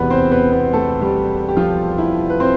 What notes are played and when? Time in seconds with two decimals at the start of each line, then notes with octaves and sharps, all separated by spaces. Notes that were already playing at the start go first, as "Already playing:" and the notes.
Already playing: E1 E2 C3 E3 B3 B4
0.10 C4 C5
0.31 B3 B4
0.52 B3 B4
0.73 A3 A4
1.01 G3 G4
1.48 G4
1.57 F3 F4
1.98 E4
2.30 B4
2.40 C4 C5